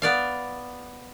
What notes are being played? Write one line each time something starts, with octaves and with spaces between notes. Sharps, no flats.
B3 D5 F5